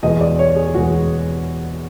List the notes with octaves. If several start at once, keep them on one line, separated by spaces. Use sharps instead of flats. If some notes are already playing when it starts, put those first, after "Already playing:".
E2 B2 G#3 D#5
D5
C#5
G#4
E2 B2 G#3 F#4